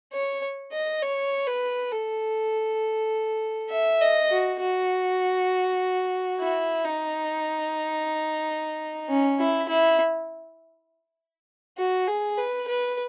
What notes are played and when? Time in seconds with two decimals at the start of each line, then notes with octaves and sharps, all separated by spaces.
0.13 C#5
0.72 D#5
1.02 C#5
1.47 B4
1.92 A4
3.70 E5
4.01 D#5
4.31 F#4
4.60 F#4
6.40 E4
6.85 D#4
9.09 C#4
9.39 E4
9.69 E4
11.78 F#4
12.08 G#4
12.38 B4
12.68 B4